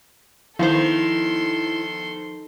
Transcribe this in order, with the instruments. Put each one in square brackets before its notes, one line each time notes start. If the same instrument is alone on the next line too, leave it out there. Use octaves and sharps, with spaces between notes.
[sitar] D#3 [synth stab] F3 B3 C5 [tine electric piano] E4 [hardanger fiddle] A4 C6